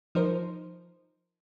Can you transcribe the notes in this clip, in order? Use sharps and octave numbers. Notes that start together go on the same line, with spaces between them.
F3 D#4 A#4 C5